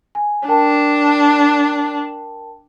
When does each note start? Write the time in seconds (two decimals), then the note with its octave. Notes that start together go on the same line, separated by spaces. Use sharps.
0.15 G#5
0.48 D4 A#4 G5 A5